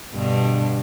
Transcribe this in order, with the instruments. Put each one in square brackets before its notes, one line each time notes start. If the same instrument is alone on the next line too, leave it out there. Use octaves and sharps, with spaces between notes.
[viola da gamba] G2 B2 D3